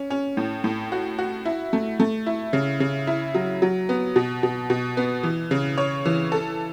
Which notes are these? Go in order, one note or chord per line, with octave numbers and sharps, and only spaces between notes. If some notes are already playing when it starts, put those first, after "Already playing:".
Already playing: C#4
C#4
A2
A2
F#4
F#4
E4
A3
A3
E4
C#3
C#3
E4
F#3
F#3
B3
B2
B2
B2
B3
E3
C#3
C#5
E3
A4